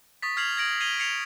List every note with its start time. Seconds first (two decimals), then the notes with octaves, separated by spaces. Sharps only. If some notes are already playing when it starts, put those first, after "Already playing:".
0.22 C#6 D#6 A6 B6
0.36 C#6 F6 G#6 C7 F7 F#7
0.57 G#6 A#6 D7 F#7
0.80 G#6 C7 D#7 F7 G7
0.99 G#6 C7 C#7 F7